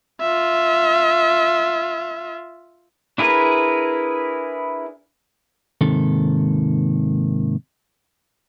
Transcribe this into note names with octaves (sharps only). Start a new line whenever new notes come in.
F4 E5
D4 E4 G#4 A#4 B4
D#2 G#2 C3 D#3 A4